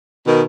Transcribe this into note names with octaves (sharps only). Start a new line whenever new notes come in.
B2 D#3